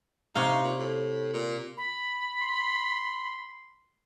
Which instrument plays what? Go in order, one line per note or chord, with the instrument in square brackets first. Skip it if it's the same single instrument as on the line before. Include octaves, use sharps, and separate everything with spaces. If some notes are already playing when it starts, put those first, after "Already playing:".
[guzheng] C3 C#5 F5 [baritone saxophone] D#4
[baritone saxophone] A#2
A2
A#2
[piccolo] B5
[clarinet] C6